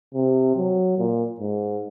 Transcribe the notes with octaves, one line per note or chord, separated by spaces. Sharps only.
C3
F#3
A#2
G#2